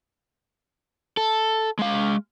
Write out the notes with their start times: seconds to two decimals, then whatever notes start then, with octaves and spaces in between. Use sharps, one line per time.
1.17 A4
1.79 G#3 F5